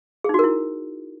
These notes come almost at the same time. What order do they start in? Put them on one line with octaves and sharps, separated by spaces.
G#4 D#4 F#4 A#4 E4